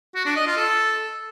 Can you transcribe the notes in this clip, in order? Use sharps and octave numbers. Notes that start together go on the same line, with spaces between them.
F#4
D4
D#5
F4
A4